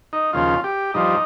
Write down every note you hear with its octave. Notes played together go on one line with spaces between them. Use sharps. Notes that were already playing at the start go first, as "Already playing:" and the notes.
D#4
D#2 C#3 F3 F4
G4
G2 F3 D#4